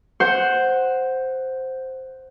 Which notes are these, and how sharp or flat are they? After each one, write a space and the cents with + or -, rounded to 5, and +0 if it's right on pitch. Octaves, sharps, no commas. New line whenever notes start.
C5 +0 F#5 +0